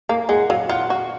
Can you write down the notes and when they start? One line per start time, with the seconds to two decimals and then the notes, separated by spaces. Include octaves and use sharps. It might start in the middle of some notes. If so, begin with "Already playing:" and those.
0.09 A#3 F5
0.29 G#3 F#5
0.50 F#3 F5
0.69 F4 F#5
0.90 F#4